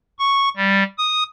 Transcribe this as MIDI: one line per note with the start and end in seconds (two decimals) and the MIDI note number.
0.19 0.49 85
0.57 0.83 55
0.98 1.23 87